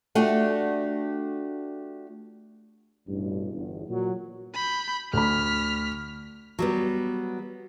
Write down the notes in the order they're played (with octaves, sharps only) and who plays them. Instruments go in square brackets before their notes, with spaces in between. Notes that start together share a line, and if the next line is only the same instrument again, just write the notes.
[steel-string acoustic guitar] A3 D4 F#4 G4
[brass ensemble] A1 G2 B2
G1 E2
A#2 F#3
[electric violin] B5 G6
[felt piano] D2 B5 [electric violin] F6 B6
[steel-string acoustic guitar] F#3 G3 B3